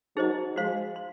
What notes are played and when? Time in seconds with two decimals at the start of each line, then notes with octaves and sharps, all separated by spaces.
0.16 D#3 F#3 D#4 G#4 C5 D#5
0.56 F3 G#3 F#4 C5 F5 C6
0.96 C6